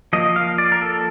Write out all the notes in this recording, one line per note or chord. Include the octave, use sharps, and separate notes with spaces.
F3 A#3 D#5
F5
D5
A#4
A4